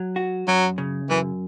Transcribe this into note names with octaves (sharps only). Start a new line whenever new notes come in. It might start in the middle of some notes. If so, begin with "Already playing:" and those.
Already playing: F#3
F#4
F#2 F#3
C#3
F#2 E3